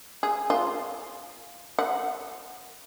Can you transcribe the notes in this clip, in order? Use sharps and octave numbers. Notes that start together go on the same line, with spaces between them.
G#4
F4
F#5